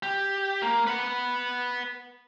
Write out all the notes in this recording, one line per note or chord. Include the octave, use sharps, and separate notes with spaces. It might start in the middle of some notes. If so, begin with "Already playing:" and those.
G4
A#3
B4 F#5